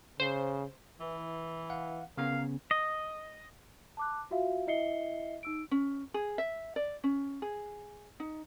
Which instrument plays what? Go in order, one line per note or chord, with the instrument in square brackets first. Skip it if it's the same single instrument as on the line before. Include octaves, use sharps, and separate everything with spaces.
[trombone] C#3 [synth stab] C5
[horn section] E3
[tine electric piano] F5 F#5
[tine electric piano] C#3 B3 C#4 [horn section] A#4 F5
[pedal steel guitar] D#5
[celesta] A5 D6 F#6
F4 F#4 E5 F5
E4 D#5 E5 C7 C#7 G7
D#4 E6 D7
[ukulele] C#4
G#4
E5
D5
C#4
G#4
D#4